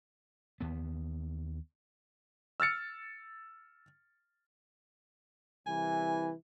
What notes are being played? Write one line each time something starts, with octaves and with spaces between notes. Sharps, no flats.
D#2 B3
E6 F6 A6 C#7
C2 E3 G#5